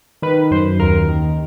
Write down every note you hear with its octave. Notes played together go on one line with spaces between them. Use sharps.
D#3 B4
F#2 C5
D#2 A#4
D#3